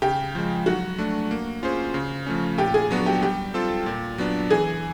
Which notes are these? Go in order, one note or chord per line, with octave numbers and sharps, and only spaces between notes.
C#3 G4
F3 G#3
F#3 F#4
A3 D4
A#3
C#4 F4 G#4 C5
C#3
F3 A3 C#4
A#2 G4
G#4
F#3 B3 D4 F#4
G4
G3 G4
C4 F4 A4
A#2
F#3 B3 D4
E3 G#4